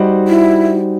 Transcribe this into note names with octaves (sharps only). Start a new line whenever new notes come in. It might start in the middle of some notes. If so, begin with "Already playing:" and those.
Already playing: G3 D#4 F#4 C5
E4